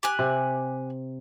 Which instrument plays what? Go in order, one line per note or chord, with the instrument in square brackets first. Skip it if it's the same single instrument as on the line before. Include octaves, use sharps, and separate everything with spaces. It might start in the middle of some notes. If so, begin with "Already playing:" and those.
[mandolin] G4 G#5 F#6
[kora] C3